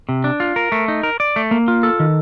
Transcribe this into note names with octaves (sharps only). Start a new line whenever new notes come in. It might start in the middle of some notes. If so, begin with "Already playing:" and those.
C3
D4
F4
A#4
A3
D#4
A#4
D5
A3
A#3
F4
A4
D#3